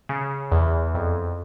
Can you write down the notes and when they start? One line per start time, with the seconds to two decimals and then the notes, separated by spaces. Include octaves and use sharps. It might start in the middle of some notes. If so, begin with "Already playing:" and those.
0.09 C#3
0.52 E2
0.94 F2